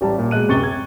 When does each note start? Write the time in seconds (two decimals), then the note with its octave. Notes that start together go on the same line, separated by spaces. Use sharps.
0.01 A1 G3 A5 A#5
0.19 A#2
0.31 B2 G#3 F#6 D#7
0.48 D1 F#2 C3 C#6 A6 G7
0.64 G#6